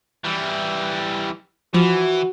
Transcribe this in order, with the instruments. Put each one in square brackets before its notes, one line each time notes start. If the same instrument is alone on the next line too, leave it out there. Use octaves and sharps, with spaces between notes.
[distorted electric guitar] E3 G3
[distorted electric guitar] E3 [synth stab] F3 [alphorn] F#4